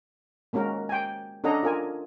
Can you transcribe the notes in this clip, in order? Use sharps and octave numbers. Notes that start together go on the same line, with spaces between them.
G#3 A#3 C#4 F#4 A#4
G5 G#5
C#4 D4 A4 D#5 F#5 A#5
F4 A#4 G#5